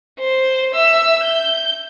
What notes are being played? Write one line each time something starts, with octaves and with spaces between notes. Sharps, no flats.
C5
E5 E6
G6